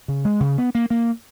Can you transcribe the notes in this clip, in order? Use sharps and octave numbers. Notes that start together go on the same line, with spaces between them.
C#3
G#3
C#3
B3
A#3
A#3